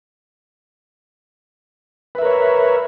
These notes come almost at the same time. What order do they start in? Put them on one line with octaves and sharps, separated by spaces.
B4 E5 A#4 C#5